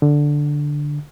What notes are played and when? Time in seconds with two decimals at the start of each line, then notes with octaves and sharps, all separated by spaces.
0.02 D3